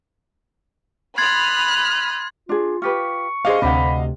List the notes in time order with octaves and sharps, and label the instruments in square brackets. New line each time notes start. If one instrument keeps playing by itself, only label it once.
[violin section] B5 D#6 F6 [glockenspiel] C6 A6 C7 [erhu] F#6 [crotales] G#6
[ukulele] D4 G#4 [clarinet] F4
[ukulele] F4 G4 B4 [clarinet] C#6
[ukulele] D4 G#4 C5 [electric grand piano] D#5 F5
[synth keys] D2 C3 [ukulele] D4 F#5 [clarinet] B5